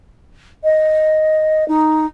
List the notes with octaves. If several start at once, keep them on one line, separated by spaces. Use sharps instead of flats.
D#5
D#4